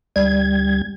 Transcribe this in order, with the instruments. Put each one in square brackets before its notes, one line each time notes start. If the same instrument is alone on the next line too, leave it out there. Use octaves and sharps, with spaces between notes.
[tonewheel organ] D2 G3 G#6